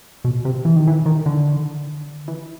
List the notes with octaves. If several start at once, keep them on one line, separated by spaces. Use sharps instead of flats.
B2
C3
E3
D#3
E3
D#3
D3
E3